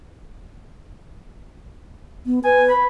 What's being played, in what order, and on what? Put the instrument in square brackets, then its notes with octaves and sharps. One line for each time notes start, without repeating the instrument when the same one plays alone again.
[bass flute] B3
[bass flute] B4 [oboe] G#5
[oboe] B5